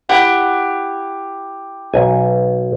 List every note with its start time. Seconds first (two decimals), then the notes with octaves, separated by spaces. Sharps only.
0.09 E4 G4 F#5
1.94 B1 G#5